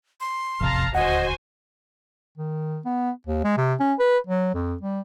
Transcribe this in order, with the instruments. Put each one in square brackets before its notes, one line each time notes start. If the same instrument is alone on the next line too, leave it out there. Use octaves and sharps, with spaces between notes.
[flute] C6
[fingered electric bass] E1 A1 [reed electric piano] F2 C3 [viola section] F5 A5 A#5
[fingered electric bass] D#1 D2 [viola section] F#4 C5 G#5 [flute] D#5 [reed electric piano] F#5
[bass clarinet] D#3
B3
D#2
G#3
C3
C#4
B4
F#3
F2
G3